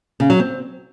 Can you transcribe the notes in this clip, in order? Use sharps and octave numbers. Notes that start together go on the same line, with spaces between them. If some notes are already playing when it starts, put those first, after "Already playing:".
C#3
F#3
C4